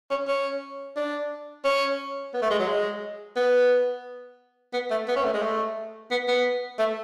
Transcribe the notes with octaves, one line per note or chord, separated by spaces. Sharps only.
C#4
C#4
D4
C#4
B3
A3
G#3
F#3
G#3
B3
B3
A3
B3
C#4
A3
G#3
A3
B3
B3
A3